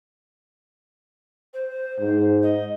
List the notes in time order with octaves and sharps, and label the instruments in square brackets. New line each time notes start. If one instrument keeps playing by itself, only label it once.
[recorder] C5
[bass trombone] G#2
[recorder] D#5